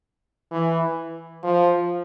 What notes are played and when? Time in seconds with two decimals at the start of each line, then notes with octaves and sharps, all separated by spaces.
0.51 E3
1.43 F3